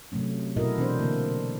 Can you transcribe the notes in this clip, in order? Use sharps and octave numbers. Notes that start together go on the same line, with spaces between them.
C3 F#3 A3 C#4
B2 E4 F#4 A4 A#4 D#5
E3 C4 D4 C5
B2 D3 E3 A#3